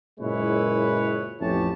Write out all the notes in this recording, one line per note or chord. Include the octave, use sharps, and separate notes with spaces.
F#1 A#2 G#3 E4 B4 C#5
A1 F2 E3 G4 C#5 A5